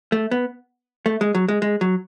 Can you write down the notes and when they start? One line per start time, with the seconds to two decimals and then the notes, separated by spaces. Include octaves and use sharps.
0.12 A3
0.31 B3
1.06 A3
1.21 G#3
1.35 F#3
1.49 G#3
1.62 G#3
1.81 F#3